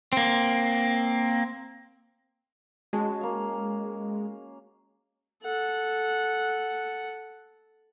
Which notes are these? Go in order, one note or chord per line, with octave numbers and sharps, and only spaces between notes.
A#3 C4
G#3 C#4 F#4 A5
A#3 F5
A4 F#5